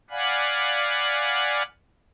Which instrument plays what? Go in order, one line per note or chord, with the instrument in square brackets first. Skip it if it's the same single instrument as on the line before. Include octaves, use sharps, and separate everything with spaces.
[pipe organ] D5 F5 F#5 G#5 B5